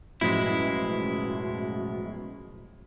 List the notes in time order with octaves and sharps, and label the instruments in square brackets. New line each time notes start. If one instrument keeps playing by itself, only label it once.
[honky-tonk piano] A1 F#2 F3 [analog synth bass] B2 [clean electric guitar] G#3 E4